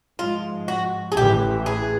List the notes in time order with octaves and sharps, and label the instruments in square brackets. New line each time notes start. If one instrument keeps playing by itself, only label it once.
[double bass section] G#2 F3 G#3 [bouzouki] F4
[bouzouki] F#4
G#4
[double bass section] A1 A2 E3 [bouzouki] G4
[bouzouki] G#4